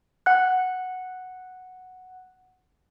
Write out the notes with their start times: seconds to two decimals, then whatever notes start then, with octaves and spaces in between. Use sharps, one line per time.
0.26 F#5 F#6